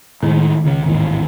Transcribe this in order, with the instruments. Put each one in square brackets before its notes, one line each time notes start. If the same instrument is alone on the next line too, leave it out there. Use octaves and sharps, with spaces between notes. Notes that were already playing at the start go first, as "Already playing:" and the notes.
[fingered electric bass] A2 G#3 [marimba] D#3
[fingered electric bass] C#2 C#3
A1 D#2 G#2